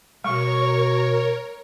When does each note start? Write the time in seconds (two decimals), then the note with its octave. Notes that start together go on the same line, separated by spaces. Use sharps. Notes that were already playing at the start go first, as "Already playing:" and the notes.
0.24 B2 G3 A#4 C#5 C#6